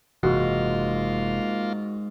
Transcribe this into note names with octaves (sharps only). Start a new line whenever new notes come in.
F#1 G#2 C3 E3 A#3 F4 F#4